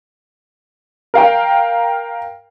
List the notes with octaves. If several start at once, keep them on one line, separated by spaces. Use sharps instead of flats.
A#4 F5 G5